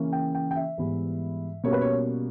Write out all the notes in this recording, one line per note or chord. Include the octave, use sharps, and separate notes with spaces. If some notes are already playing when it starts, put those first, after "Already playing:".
Already playing: C#3 E3 A#3 C#4
G5
G5
G5
E5
G#2 E3 G3 B3
B2 G3 A#3 C#4 C#5
B4
C#5